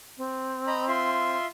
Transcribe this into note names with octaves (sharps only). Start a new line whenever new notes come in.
C4
D#5 A#5 B5
F4 E5 C6